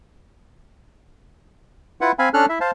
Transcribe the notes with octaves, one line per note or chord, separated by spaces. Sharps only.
E4 F4 B4 F#5
C4 F5 G#5 B5
C#4 D4 A4 F6 F#6
E4 E5
C5 F5 A5